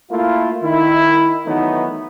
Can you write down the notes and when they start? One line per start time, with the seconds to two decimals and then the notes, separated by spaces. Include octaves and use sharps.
0.12 A3 A#3 E4 F4
0.63 D#3 E4
1.47 D#3 E3 F#3 A3 B3 D#4